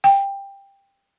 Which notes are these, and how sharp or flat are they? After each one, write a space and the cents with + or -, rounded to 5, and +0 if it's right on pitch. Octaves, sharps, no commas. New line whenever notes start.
G5 +15